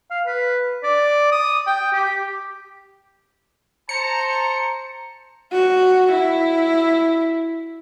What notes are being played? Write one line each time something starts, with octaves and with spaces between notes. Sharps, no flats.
F5
B4
D5
D#6
G5
G4
C5 A5 A#5 C#7
F#4
E4